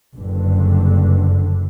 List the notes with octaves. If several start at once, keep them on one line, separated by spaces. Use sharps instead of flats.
F#1 G2 D3